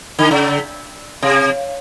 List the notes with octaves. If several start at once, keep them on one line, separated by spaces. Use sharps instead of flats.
D3
C#3
C3